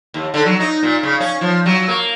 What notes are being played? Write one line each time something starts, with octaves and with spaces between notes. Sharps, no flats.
D#2
D3
F#3
D#4
A#2
C#3
C#4
F3
F#3
A#3